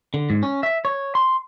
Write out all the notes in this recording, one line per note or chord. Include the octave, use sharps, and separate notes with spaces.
D3
G#2
C#4
E5
C#5
C6